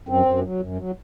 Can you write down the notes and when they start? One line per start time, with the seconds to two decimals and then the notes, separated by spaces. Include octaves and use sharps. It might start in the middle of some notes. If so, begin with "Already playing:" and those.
0.09 F#2 C4
0.25 F#2
0.43 F#3
0.60 F#2
0.78 F#3